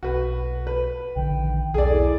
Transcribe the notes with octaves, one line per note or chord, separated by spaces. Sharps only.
B1 F#4 B4
B4
A#1 D3 D#3 G5
B1 E2 G#4 A4 D5
E4